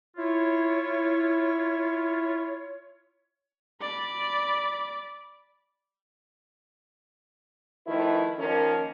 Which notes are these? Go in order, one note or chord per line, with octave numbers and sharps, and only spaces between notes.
E4 F4 C#5
D5 B5
D#3 F3 A3 E4 B4
D#3 F3 A#3 C#4 A#4